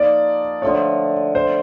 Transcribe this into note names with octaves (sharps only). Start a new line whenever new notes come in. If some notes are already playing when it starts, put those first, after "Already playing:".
Already playing: F3 A#3 D#4 D5
D3 F3 A3 C#5
C5